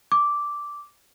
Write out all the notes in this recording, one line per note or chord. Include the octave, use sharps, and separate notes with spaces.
D6